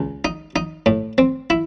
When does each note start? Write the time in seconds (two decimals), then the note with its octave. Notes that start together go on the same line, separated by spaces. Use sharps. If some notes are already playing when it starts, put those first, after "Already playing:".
Already playing: C#2
0.25 D#4
0.56 D#4
0.86 A2
1.18 C4
1.50 E4